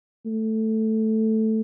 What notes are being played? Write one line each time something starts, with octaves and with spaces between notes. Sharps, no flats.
A3